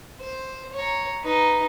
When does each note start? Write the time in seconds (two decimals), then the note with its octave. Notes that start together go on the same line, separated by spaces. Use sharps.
0.20 C5
0.73 C#5 A#5
1.21 D#4 B4